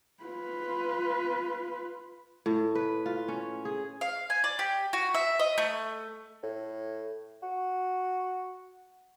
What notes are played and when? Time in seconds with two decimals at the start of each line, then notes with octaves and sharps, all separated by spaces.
0.24 F4 B4
2.46 A2
2.75 B4
3.06 F4
3.28 C#4
3.65 G#4
4.01 F5
4.30 G#5
4.44 D5
4.59 G4
4.93 F#4
5.14 E5
5.39 D#5
5.58 A3
6.43 A2
7.43 F#4